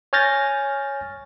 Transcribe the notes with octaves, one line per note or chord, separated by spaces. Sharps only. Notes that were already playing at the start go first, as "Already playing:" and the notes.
C#5 G#5 F6 G6 A6 A#6